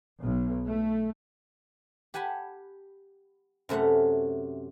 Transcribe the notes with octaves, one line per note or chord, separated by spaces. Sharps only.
B1
A3
G4 F#5 G#5 A5 B5
F#2 C3 A3 C#4 F#5